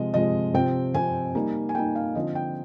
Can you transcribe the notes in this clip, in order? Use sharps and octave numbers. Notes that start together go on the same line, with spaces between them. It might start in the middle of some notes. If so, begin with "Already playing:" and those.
Already playing: C3 F3 G#3 D#5
C3 F3 G#3 D#5
C3 F3 C4 G5
C3 F3 C4 G#5
G3 A#3 D#4
G#5
G3 A#3 D#4 G5
F5
D3 F3 C4 D#5
G5